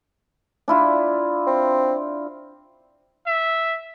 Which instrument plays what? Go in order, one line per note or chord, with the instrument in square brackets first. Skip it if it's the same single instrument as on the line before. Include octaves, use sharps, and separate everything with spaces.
[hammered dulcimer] D4 E4 F4
[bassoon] C4
[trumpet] E5